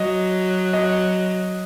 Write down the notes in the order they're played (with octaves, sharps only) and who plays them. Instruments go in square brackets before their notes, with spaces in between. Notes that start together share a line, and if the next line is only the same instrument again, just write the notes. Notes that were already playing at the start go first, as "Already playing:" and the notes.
Already playing: [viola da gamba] F#3 [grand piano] D#5
[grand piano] D#5